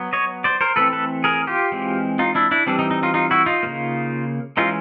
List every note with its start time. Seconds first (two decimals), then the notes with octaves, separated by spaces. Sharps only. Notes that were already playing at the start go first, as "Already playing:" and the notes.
Already playing: F#3 B3
0.13 C#5 D#5
0.44 C5 D5
0.61 A#4 C5
0.76 E3 A3 C4 A4 B4
0.93 A4 B4
1.24 G#4 A#4
1.47 F4 G4
1.72 E3 G#3 C4
2.19 D#4 F4
2.35 D4 E4
2.51 D4 E4
2.66 E3 G3 C4 D4
2.79 D#4
2.91 D#4
3.03 D#4 F4
3.14 D#4 F4
3.31 E4 F#4
3.46 D#4 F4
3.63 C#3 F3 A#3
4.57 E3 G#3 C#4 D#4 F4